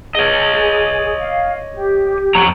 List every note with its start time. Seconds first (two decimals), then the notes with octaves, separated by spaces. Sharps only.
0.15 G#4 C#5 D#5
1.20 F5
1.75 G4
2.35 F2 C#5 A#5